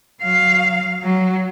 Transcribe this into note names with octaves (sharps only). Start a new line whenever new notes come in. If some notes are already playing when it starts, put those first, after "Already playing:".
F#3 F5
F#3